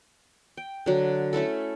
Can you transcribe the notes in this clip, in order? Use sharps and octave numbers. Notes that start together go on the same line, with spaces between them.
G5
D3 F#3
A3 C#4 E4 A4